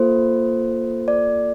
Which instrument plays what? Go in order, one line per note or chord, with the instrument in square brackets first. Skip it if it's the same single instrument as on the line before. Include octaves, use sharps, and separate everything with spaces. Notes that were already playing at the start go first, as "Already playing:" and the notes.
Already playing: [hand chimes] A#3 F4 A4 C5
D5